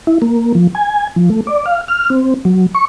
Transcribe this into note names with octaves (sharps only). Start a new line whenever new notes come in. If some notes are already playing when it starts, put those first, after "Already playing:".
E4
A#3
F3
G#5
F3
A3
D5
F5
F6
C4
F#3
C#6